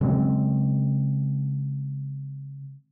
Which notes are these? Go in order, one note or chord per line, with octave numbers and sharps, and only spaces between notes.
C#3 F#3 G#3 C4